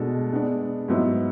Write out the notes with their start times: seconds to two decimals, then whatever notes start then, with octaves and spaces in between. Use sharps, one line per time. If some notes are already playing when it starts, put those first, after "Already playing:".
Already playing: B2 G#3 D4 A4
0.31 G#3 B3 D4
0.88 G#2 F#3 B3 E4